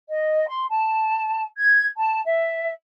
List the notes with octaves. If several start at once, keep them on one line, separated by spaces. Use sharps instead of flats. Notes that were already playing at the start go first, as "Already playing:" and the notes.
D#5
C6
A5
G#6
A5
E5